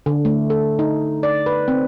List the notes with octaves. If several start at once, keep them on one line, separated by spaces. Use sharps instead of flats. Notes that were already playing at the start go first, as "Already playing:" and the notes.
D3
A3
A4
D#4
D5
B4
C4